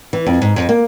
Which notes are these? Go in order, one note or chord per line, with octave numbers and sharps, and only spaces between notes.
E3
F2
G#2
F2
A#3